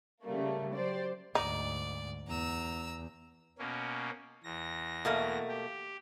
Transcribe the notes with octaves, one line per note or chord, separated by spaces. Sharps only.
C#3 G3 A3 A#3
F#3 G4 C5 D5
D2 G#2 D#4 D5
E2 A#5 E6
B2 A#3 C#4
E2 A#6
B2 A3 A#3
G4